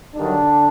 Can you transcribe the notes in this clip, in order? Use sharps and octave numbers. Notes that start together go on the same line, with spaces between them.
G2 D3 D#3 F#3 D4